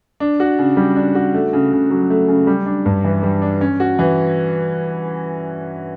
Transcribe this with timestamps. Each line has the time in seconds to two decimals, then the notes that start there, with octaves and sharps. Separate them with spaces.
0.20 D4
0.40 F#4
0.59 C#3
0.77 G3
0.96 D4
1.15 F#4
1.34 A3
1.53 C#3
1.72 C#3
1.90 F#3
2.10 A3
2.28 C#3
2.47 G3
2.66 D4
2.86 G2
3.04 E3
3.23 G3
3.42 D4
3.61 C#4
3.80 F#4
3.99 E3